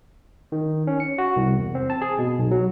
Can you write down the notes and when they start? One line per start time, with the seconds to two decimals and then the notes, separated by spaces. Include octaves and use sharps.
0.52 D#3
0.87 C#4
1.00 C#7
1.18 F#4
1.36 C2
1.59 E2
1.75 C4
1.90 A5
2.02 G#4
2.19 B2
2.39 B1
2.51 F#3